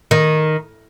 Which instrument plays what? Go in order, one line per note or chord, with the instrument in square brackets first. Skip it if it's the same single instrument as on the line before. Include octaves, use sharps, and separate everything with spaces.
[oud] D#3